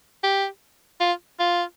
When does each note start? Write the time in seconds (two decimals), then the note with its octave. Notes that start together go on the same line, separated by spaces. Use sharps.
0.23 G4
1.00 F4
1.39 F4